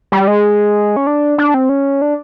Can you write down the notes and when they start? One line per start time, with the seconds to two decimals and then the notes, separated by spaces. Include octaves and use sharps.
0.12 G3
0.28 G#3
0.97 C#4
1.07 D4
1.38 D4
1.54 C4
1.69 C#4
2.02 D4